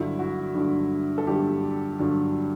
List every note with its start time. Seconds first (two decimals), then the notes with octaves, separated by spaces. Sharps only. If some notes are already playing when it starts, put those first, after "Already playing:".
Already playing: G2 D3 F#3 E4
0.19 F#4
0.55 G2 D3 F#3
1.18 A4
1.27 G2 D3 F#3 G4
1.99 G2 D3 F#3